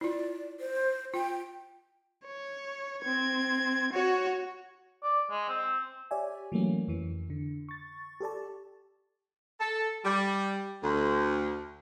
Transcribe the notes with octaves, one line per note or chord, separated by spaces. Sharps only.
E4 F4 D5
C5
F4 G5
C#5
C4 G#6
F#4 C#5
D5
G#3
C4
G4 C#5 D5 E5 G#5
E3 F#3 A3 A#3 C#4
F2 E3
D3
C#6 A6
G4 A4 D5 A5
A4
G3
D2